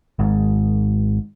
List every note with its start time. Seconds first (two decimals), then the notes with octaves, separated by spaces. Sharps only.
0.19 G#1 G#2